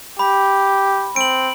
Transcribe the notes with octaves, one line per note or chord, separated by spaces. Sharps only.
G4 B5
C4 D7 F#7